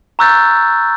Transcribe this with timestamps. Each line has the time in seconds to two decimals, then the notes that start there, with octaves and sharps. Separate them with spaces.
0.19 A#5 C#6 E6 F#6 G6 A6